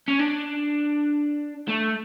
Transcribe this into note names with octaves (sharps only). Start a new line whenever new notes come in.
C#4
D4
A3